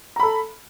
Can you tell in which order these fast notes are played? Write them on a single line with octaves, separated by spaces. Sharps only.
A#5 B5 A4